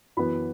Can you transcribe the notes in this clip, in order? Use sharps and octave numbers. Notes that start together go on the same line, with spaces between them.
F#2 E3 B3 B5